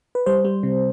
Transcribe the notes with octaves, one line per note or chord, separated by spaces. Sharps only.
B4
G3 C5
G3
C3